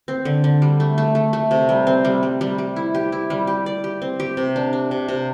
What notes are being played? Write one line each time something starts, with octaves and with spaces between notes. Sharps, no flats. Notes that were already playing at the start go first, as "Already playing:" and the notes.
C4
D3
D3
G3
A3
A3
A3
A3
C3
G3
C4
G3
G3
G3
G3
E4
G4
E4
G3
G4
D5
G4
C4
G4
C3
D4
D4
C3
C3